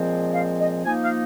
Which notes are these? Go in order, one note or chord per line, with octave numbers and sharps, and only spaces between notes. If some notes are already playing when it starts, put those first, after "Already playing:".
Already playing: A#2 F3 G#3 C4
F5
D#5
F3 A#3 D#4 G#5
F5